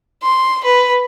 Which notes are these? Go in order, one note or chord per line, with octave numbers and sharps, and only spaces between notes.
C6
B4